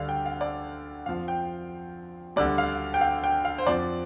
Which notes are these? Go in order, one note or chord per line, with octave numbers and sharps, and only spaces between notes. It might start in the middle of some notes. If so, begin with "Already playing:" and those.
Already playing: D2 D3 G3 D5 F5
G5
F5
D5
F2 F3 F5
G5
D2 D3 G3 D5
F5
G5
F5
G5
F5
C5
F2 F3 D5